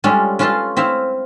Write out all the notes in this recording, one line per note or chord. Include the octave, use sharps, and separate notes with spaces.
G3 G#3 C#4 F4 A4
C#4 F4 A4 B4 A5 C6
C4 E4 E5 F5